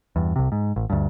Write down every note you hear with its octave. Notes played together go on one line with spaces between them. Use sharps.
E2 G2
C2 C3
G#2
A1
D2 G2